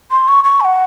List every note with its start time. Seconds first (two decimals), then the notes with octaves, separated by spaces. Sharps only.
0.11 C6
0.28 C#6
0.44 C#6
0.61 G#5
0.65 F#5